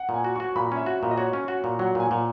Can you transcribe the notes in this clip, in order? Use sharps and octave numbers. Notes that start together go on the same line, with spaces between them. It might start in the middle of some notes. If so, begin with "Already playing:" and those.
Already playing: F#5
A#2
G#5
F#4
F#4 C#6
A#2 B5
C#4 E5
F#4
A#2
D#5
F#4 C#5
C#4
F#4
A#2
F#3 F#5
A#2 G#5
A#2